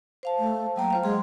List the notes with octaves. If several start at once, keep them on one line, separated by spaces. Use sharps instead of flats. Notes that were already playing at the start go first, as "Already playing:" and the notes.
C5 F5 A5
A3
F#3 A#3 G5 A#5
F4 C5 F5
F#3 G#3 G#4 C6